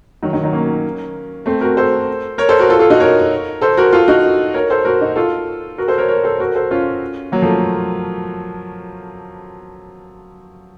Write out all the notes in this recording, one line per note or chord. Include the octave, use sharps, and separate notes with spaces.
D#3 F#3
D#3 F#3
D#3 F#3
A#3 C#4
A3 C4
F#4 A#4
A4 C5
A#4 C#5
A4 C5
F#4 A#4
F4 A4
F4 A4
D#4 F#4
A#4 C#5
A4 C5
F#4 A#4
F4 A4
D#4 F#4
A#4 C#5
A4 C5
F#4 A#4
D#4 F#4
F4 A4
F#4 A#4
A4 C5
A#4 C#5
A#4 C#5
A4 C5
F#4 A#4
A4 C5
C#4 F4
F#3 A#3
F3 A3